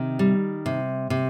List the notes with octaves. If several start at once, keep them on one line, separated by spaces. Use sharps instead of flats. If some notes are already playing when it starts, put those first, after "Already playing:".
Already playing: C3 D#3
G3
C3
C3